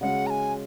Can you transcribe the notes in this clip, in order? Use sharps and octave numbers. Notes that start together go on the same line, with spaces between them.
C#3 G#3 C#4 F#4 F#5
A#5
G#5